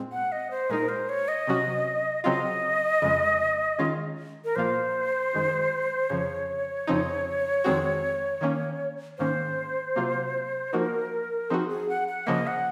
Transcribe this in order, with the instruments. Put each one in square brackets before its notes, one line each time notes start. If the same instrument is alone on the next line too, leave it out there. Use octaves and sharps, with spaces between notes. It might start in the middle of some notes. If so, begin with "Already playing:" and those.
Already playing: [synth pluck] A#2 G#3 C4
[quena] F#5
D#5
C5
[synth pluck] A#2 G#3 D#4 [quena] A#4
[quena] C5
C#5
D#5
[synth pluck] C3 F#3 C#4 F#4
[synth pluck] C#3 F#3 C4 F4 [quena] D#5
[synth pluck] F2 C#3 G#3
D#3 G#3 C#4 F4
[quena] A#4
[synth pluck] A#2 F3 A#3 F4 [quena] C5
[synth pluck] F#2 D#3 G#3
[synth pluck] F2 C#3 F3 [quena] C#5
[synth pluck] F2 C#3 F3 C4 D#4
F2 D#3 G#3 C4 F#4
D#3 A#3 C#4
[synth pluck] G#2 D#3 A#3 C#4 [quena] C5
[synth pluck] C3 F#3 A#3 F4
[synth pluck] F3 A#3 D#4 F#4 [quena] A#4
[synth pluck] F3 C4 D#4 F#4 [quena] G#4
[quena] G#4
F#5
F#5
[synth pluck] C#3 F3 A#3 [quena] D#5
[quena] F#5